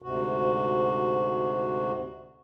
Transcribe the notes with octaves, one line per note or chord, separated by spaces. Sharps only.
D2 G#2 C3 F#4